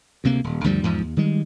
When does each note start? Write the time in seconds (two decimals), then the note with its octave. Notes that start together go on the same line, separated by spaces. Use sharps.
0.24 D2 C3 A#3
0.44 D#1
0.64 D2 G2 F3 G3
0.84 E2 G#2 F3
1.02 D#2
1.17 D#3 G3 G#3